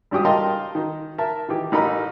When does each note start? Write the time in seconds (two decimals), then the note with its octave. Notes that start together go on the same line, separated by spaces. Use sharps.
0.11 G#1 G2 G4 D#6
0.25 A#4 D#5 F5 G5 A5 C6
0.75 D#3
1.18 A#4 E5 A5
1.49 D#3 E3 G4
1.72 A1 D#4 A#4 B5